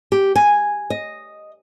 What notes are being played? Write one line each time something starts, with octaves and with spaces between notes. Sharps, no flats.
G4
G#5
D#5